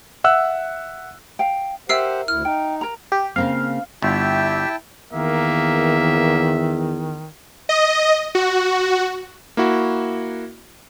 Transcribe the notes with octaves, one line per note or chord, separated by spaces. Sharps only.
E5 F#5 E6 F#6
F5 G5
G4 A#4 C5 E5 F#5 E6 C7
D2 E4 F6
D#4 G5
A#4 A#5
G4
C#3 A#3 C4 F5
G1 E4 G4 E5 G5 A5
E2 D#3 A#3 E5
D#5
F#4
A#3 E4 F#4